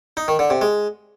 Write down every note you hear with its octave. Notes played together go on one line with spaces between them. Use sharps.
D#4
D#3
D3
C3
G#3